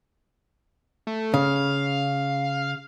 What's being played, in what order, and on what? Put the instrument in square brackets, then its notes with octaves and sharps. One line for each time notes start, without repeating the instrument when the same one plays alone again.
[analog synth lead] A3
[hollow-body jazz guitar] C#3 [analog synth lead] F5
[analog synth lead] F5